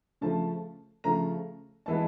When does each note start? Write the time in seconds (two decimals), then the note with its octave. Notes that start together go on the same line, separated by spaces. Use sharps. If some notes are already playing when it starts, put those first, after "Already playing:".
0.21 C#3 F3 A3 A5
1.04 C#3 F3 A3 A#5
1.86 E3 G#3 B3 A5